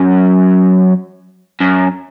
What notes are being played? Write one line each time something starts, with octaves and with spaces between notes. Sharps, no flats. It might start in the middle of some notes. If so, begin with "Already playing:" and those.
Already playing: F#2
F#2